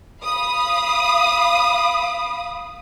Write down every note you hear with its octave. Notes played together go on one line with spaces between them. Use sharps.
F5 B5 D#6